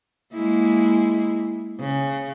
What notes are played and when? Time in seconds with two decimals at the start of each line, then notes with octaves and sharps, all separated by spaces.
0.34 G#3 A#3 E4
1.80 C#3